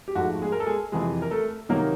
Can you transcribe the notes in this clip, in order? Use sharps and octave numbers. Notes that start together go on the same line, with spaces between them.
G4
G#2 F3 A3 F#4
G#3 G#4
A#4
A4
G#3 G#4
F2 C3 E3 G#3 G#4
A#4
A3 A4
C3 D#3 F#3 A#3 D#4 A#4